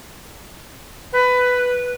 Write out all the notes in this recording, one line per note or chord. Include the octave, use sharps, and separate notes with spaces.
B4